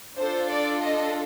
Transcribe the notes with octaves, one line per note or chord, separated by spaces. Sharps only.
D4 F4 A4 C5
D5
D#5